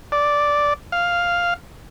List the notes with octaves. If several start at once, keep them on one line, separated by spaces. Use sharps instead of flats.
D5
F5